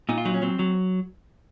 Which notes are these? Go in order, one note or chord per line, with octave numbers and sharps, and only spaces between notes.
A#2 D#4
F4
F#3 D#4
C#4
F#3 C4
F#3